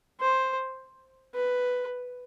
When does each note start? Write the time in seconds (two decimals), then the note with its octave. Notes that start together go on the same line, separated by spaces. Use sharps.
0.21 C5
1.35 B4